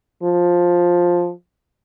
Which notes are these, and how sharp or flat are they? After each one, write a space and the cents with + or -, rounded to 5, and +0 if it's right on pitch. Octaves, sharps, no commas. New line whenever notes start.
F3 +10